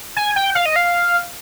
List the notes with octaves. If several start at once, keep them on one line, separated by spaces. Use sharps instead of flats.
G#5
G5
F5
D#5
F5